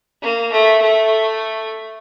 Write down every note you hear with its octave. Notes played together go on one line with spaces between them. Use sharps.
A#3
A3
A3